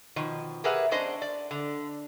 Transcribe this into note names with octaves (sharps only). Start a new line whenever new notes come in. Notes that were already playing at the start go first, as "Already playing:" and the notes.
B2 D#3 F3
G4 G#4 A#4 B4 E5 F#5
B3 C#4 D4 C5 D#5
D5
D3